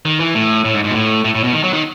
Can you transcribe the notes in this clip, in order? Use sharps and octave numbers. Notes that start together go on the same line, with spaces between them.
D#3
E3
A2
A2
G#2
G#2
B2
A2
A2
A2
B2
D#3
F#3
D#3